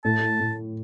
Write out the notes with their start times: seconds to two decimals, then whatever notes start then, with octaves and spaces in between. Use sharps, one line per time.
0.04 A2 A5
0.40 A2